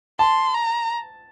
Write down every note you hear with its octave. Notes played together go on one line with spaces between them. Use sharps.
A5 C6
A#5